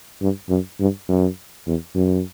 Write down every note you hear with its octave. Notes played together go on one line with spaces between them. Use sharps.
G2
F#2
G2
F#2
E2
F#2